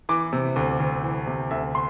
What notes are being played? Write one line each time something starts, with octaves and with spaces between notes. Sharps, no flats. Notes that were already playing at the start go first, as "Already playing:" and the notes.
E3 D6
C3
D2
D2
E3
C3
D2 E5
C6